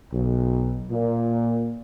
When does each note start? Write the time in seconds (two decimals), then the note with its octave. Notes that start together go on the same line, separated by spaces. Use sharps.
0.13 B1
0.90 A#2